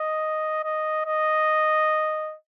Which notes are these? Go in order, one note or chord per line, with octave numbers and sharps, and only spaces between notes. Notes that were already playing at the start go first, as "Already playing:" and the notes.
Already playing: D#5
D#5
D#5